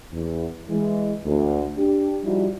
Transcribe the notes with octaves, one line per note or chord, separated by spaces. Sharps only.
E2
E3 G#3
D2
D4 G4
F3 G3 D#4 E4 F#4